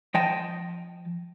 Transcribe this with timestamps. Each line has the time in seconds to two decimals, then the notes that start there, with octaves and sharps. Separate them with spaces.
0.14 F3 D#5 G5 A5